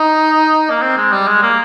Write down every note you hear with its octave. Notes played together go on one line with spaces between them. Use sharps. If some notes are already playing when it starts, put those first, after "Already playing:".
Already playing: D#4
A#3
C4
G#3
G3
G#3
A#3